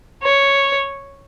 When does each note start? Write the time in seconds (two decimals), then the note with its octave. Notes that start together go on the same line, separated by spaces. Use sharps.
0.22 C#5